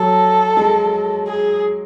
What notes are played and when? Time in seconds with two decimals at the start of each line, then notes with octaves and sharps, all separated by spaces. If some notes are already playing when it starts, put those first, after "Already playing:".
Already playing: F#3 A4
0.57 G#3
1.27 G#4